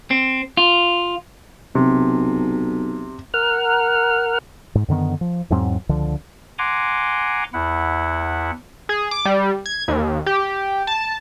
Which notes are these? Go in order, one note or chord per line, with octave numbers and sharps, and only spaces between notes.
C4
F4
B1 C3
A#4 F#5 F6
G#2
F#2 D3 D#3 B3
F3
E2 G#2 F#3 C4
C#2 D3 F3
F#5 G#5 A#5 C6 D6
E2 E4 F#5
G#4
D6
G3
G#6
D#2
G4
A5